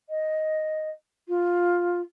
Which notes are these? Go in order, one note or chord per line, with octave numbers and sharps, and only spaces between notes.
D#5
F4